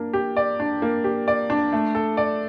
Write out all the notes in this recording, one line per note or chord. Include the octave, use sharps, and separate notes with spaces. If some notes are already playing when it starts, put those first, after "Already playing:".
Already playing: A#3 D4
G4
D5
D4
A#3
G4
D5
D4
A3
A4
D5